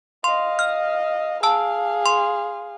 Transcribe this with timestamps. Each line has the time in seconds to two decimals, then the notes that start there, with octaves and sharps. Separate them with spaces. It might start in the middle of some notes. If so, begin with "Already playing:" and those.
0.24 D#5 F5 C6
0.59 F6
1.43 G#4 F5 A5 E6
2.06 C6